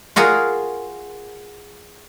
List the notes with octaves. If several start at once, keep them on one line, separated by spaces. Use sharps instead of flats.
F4 F#4 G#4 A#4